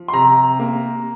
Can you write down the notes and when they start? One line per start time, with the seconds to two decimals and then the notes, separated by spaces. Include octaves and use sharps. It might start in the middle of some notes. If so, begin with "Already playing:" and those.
Already playing: F3
0.08 C6
0.13 C3 A#5
0.60 A#3